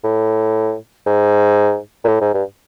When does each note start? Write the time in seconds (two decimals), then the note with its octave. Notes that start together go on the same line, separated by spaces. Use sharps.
0.04 A2
1.06 G#2
2.04 A#2
2.08 A2
2.21 G#2
2.34 G2